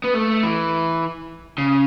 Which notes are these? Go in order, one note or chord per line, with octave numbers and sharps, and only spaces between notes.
B3
A3
E3
C#3